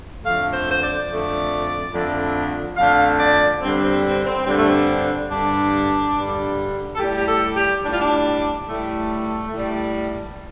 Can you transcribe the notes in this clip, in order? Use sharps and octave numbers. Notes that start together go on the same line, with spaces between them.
F2 D3 A3 F5
C5
C5
D5
F2 D3 A3
F2 D3 A3
F2 D3 A3 F5
D5
G2 D3 G3 C4
C4
C4
C4
G2 D3 G3 C4
A3
C4
G2 D3 G3 D4
G2 D3 G3
A4
A2 G3 G4
G4
A4
G4
A2 G3 D4
F4
D4
A2 G3 A3
A2 G3